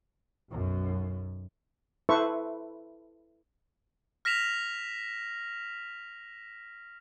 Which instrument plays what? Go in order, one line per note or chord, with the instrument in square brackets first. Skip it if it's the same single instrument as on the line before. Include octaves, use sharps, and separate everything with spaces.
[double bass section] B1 F#2
[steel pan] E4 A4 B4 C5 E5 C#6
[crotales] F6 A#6 B6 E7 F7